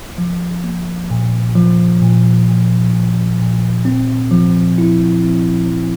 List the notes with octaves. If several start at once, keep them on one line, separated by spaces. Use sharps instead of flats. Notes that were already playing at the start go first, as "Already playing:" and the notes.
F3
A#3
A#2
F3
A#2
A#2
A#2
A#2
C4
F3
E4
C4
F3